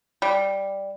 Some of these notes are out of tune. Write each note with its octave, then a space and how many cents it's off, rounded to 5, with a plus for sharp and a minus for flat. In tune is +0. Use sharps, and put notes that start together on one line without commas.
G3 +0